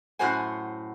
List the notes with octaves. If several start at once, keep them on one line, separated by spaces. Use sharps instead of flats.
F#2 A2 F#4 C5 F#5 G#5